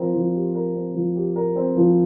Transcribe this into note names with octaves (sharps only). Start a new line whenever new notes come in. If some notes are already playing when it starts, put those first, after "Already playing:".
Already playing: F3 C4 A#4
F3
G4
A#4
C4
F3
G4
A#4
C4
F3